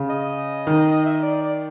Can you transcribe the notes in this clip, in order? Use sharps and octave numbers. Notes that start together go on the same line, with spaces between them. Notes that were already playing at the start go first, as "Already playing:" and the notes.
Already playing: C#3
D#5
D#3
E5
D#5
D5
D5